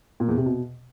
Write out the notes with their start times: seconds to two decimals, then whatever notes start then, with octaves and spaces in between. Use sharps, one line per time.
0.20 A#2
0.29 E2
0.37 C3
0.46 B2